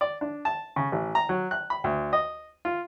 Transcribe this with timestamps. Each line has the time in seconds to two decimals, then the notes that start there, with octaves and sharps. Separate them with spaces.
0.01 D5
0.21 D4
0.45 A5
0.76 C#3
0.92 A1
1.15 A#5
1.29 F#3
1.51 F#6
1.70 B5
1.84 D2
2.13 D#5
2.65 F4